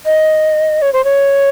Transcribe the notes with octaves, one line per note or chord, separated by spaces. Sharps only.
D#5
C#5
C5
C#5